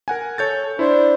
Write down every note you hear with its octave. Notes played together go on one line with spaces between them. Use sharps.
A#4 F#5 G#5
A4 C#5 G6 A6
D4 E4 C5